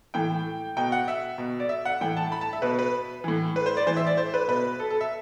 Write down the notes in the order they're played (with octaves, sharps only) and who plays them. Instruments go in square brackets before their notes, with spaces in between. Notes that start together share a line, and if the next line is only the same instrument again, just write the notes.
[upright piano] A2 E3 G5
B2 G5
F#5
E5
B2
D5
E5
F#5
A2 E3 G5
A5
B5
A5
E5
B2 B4
B4
A2 E3
B4
C5
D5
A2 E3 C5
E5
D5
C5
B4
B2 B4
A4
A4
E5